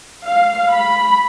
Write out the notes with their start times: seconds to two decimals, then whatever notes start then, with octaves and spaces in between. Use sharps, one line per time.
0.25 F5
0.70 B5